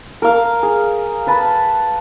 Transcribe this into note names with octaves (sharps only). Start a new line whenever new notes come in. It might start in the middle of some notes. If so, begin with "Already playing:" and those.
A#4 F5
G#4
B4 A5 B5